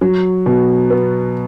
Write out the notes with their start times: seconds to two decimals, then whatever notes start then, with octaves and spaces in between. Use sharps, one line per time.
0.01 F#3
0.46 B2
0.90 B3